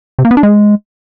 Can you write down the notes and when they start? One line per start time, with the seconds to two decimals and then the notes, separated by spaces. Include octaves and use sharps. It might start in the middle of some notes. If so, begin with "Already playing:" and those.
0.19 C3
0.25 A#3
0.31 B3
0.37 D4
0.43 G#3